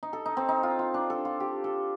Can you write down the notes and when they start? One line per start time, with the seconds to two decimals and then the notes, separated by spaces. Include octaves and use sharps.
0.03 D#4
0.13 A4
0.26 D#4
0.37 C4
0.49 D#4
0.63 F4
0.79 F4
0.94 D4
1.10 A4
1.25 F4
1.40 G4
1.64 A4